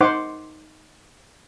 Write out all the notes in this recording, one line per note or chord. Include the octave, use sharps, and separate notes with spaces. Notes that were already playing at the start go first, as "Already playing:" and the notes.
D#4 C5 F#5 C6 D6